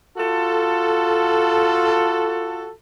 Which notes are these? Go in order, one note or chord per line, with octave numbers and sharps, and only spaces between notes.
F4 F#4 A4